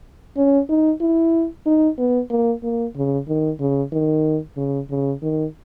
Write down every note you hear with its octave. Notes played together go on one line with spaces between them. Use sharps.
C#4
D#4
E4
D#4
B3
A#3
A#3
C#3
D#3
C#3
D#3
C#3
C#3
D#3